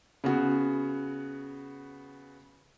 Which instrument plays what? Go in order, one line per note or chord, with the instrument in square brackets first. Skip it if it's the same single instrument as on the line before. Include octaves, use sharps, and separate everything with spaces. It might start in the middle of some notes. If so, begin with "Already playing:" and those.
[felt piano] C#3 B3 F#4